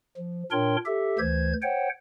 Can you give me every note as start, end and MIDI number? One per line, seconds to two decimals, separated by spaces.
0.17 0.43 53
0.51 0.76 46
0.51 0.76 62
0.51 0.76 70
0.51 0.76 73
0.51 0.76 79
0.51 0.76 84
0.86 1.19 67
0.86 1.19 69
0.86 1.19 76
1.19 1.53 38
1.19 1.53 52
1.19 1.53 72
1.19 1.53 92
1.62 1.89 72
1.62 1.89 73
1.62 1.89 78
1.62 1.89 79